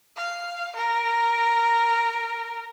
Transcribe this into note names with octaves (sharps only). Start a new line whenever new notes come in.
F5
A#4